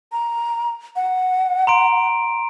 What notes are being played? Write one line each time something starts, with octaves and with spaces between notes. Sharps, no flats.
A#5
F#5
A#5 C6 D7